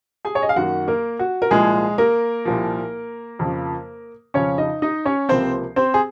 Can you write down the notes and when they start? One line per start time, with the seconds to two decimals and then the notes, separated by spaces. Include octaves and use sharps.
0.25 G#4 G#5
0.35 C#5
0.42 D#5
0.49 F5
0.56 F#2 D#3 A#3 F#4 F#5
0.88 A#3 A#4
1.19 F#4
1.42 A#4
1.51 C2 A#2 F3 G#3 G#4
1.98 A#3 A#4
2.45 C2 A#2 F3
3.39 F2 C#3 F3
4.34 F2 C#3 F3 C#4 C#5
4.58 D#4 D#5
4.82 D#4 D#5
5.05 C#4 C#5
5.29 C#2 C3 F3 A#3 C4 C5
5.76 C4 C5
5.94 G#4